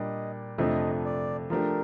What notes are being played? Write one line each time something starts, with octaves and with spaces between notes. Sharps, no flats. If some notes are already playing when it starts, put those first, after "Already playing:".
Already playing: A#2 G3 D4 D#5
F2 C3 F3 A3 D4 D#5
D5
F3 A3 D4 G4 A#4